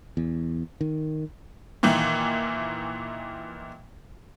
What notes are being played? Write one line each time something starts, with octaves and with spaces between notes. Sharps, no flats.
E2
D#3
A#2 D#3 E3